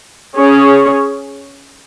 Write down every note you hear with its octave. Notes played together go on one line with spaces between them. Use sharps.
C#4 G#4 C#5